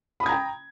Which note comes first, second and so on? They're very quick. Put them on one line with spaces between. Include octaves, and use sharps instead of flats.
B5 D#6 G#6 A#5 G5